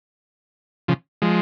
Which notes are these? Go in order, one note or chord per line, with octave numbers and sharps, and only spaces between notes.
C#3 F3
F3 G#3